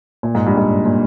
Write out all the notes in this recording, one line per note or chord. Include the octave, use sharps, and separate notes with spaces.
A#2
G#2
G2
G#2
A#2